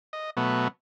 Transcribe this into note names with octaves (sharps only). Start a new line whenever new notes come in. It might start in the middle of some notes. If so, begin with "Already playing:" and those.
D#5
B2 F#3 A3 B3